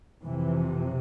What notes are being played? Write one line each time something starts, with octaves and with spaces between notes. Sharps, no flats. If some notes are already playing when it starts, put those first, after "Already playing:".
F2 C3 E3